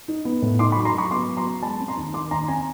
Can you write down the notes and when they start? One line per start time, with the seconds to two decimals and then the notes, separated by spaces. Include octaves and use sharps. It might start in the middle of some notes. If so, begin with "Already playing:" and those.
0.08 D#4
0.25 B3
0.42 A2
0.59 D#4 C6 D6
0.72 B5 C#6
0.77 F#3
0.85 A#5 C6
0.94 F#3 B5 C#6
1.11 B3 C6 D6
1.28 F#3
1.37 A#5 C6
1.46 B3
1.62 G#3 A5 B5
1.80 C4
1.88 A#5 C6
1.97 D#2
2.14 D#3 C6 D6
2.31 D#2 A#5 C6
2.48 C4 G#5 A#5